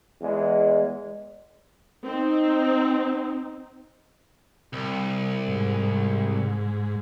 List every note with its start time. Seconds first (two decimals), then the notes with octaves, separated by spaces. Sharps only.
0.21 E2 G#3
2.04 C4 D#4
4.73 C2
5.48 G#2